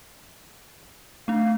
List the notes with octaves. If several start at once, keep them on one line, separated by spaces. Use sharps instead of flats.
A3 D4 F5